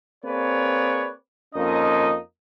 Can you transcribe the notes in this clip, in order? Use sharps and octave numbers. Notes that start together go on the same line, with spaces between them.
A#3 C4 G#4 B4 C#5 D5
F2 A#3 C#4 D#4 D#5